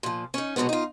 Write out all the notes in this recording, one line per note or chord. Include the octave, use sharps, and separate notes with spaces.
A#2 F3
C#4 D#4
B2 D3 F#3 G#3 B3
D#4 F4